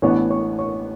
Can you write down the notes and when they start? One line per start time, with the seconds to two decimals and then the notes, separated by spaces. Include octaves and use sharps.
0.02 A1 A2 E3 B3 D4 C#5 C#6
0.30 C#5 C#6
0.59 C#5 C#6